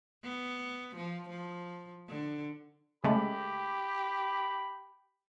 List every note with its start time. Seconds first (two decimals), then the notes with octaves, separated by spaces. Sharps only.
0.24 B3
0.96 F3
1.29 F3
2.09 D3
3.04 C#3 G#3 A3 G4 B5